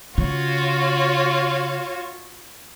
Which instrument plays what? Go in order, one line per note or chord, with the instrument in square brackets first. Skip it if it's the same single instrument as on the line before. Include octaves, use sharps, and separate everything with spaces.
[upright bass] C#3 [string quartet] F4 F#4 C#5